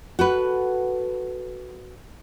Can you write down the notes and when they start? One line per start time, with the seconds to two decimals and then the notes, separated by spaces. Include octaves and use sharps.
0.19 F#4 A4 B4